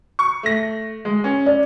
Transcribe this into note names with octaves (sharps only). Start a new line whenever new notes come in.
C#6
A3 A#6
G#3
C#4
D5